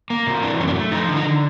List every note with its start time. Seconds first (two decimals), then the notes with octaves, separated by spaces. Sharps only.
0.10 A#3
0.27 C3
0.43 E3 D4
0.59 F#2 C#4
0.68 D4
0.75 A3
0.91 F3 D#4
1.08 D3
1.16 D#4
1.24 D3